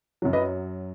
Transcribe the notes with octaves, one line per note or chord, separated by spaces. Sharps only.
F#2 F#3
B4 D#5